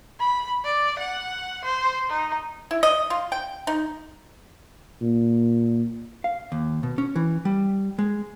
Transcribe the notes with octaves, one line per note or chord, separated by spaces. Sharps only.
B5
D5
F#5
C5
D#4
E4
D#5
F4
G5
D#4
A#2
F5
D#2
B2
C#4
E3
G3
G#3